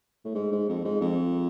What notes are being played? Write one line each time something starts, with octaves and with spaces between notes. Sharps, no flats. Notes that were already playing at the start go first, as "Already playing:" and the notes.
A2
G#2
G#2
F2
G#2
F2